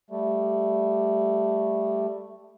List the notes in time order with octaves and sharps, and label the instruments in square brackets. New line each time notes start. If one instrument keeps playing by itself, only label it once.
[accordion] G3 A3